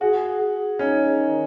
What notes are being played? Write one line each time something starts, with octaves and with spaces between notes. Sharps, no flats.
F#4 G#4
G#4
C#4 D#4
D#3